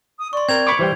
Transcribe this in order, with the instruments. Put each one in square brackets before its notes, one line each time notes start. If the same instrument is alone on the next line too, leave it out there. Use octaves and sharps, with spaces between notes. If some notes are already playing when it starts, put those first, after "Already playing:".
[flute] D#6
[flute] D5 [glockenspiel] C6 C#6
[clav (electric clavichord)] C4 A#4 [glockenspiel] G#6 F7
[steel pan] B5 C#6 D6
[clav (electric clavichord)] E3 G3 G5 [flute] C5